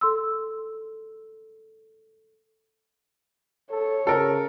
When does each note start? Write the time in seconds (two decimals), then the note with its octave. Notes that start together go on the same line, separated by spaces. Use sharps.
0.01 A4 C6 E6
3.71 A4 C#5
4.07 C#3 A4 A#4